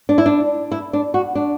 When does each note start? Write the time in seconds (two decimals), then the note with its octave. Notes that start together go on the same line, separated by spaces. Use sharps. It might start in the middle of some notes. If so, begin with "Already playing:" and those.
0.09 D4
0.18 E4
0.26 D4
0.72 E4
0.93 D4
1.14 F#4
1.35 D4